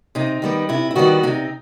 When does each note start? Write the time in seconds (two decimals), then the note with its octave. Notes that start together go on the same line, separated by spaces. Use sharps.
0.15 C3 D#4
0.42 D#3 G3 B3
0.69 C3 E4
0.91 E4
0.96 D#3 G3 B3 F#4
1.23 C3 D#4